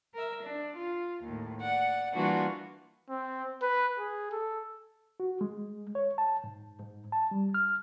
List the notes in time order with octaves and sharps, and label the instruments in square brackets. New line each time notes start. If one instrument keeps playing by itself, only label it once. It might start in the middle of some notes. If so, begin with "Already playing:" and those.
[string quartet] A#4 E5
D4
F4
D#2 A2
D5 F#5
E3 G3 A#3 D4 F4 F#4
[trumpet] C4
B4
G#4
A4
[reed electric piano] F#4
G#3
C#5
A5
G#2
G#2
A5
G3
F6